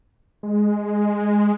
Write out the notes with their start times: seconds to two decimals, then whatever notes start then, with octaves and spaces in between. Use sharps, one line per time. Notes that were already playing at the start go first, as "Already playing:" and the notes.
0.43 G#3